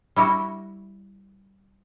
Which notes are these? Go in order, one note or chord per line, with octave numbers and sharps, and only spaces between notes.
G3 E4 F#4